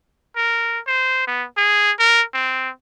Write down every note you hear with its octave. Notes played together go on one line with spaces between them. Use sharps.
A#4
C5
B3
G#4
A#4
C4